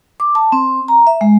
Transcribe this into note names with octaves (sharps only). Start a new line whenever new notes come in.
D6
A5
C4
A#5
E5
G#3